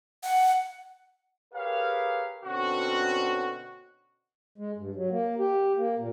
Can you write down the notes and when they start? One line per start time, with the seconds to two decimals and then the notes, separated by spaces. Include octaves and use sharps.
0.23 F#5
1.54 G4 G#4 A#4 B4 C#5 F5
2.44 B2 D3 C4 C#4 F#4
4.58 G#3
4.77 G2
4.95 F#3
5.11 A#3
5.38 G4
5.77 A#3
5.99 A#2